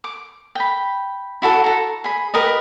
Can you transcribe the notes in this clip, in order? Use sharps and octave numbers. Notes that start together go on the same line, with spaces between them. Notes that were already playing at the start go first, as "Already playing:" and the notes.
D6
G5 B5
E4 F#4 A4 F#5
A4 A#5
G#4 B5
G4 A#4 B4 D#5